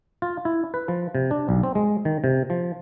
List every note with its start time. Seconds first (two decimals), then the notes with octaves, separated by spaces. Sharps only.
0.22 F4
0.45 E4
0.74 B4
0.88 F3
1.15 C3
1.31 D4
1.49 B1
1.63 C4
1.75 G#3
2.05 D#3
2.24 C3
2.50 F3